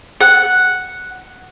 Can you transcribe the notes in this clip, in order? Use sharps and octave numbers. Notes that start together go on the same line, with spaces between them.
F#5